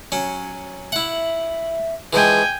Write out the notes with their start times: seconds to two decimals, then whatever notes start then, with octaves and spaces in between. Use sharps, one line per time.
0.12 F#3 C#4
0.92 E4 E5 F#5
2.13 E3 F3 G#3 G#4 G5 G#5